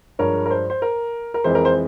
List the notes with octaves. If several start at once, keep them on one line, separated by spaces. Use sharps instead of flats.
G2 F3 G#3 A#4 C#5
A#4
C5
C5
A#4
A#4
F2 E3 G#3 C5
A#4
C5